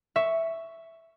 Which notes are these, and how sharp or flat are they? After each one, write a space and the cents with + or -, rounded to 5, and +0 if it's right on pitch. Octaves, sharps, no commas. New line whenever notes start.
E5 +0 C#6 +5